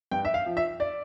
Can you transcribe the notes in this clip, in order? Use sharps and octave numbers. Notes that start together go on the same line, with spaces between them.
G2 G5
E5
F5
F3
E5
D5